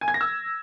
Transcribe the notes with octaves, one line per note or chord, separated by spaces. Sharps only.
G#5
G#6
A#6
E6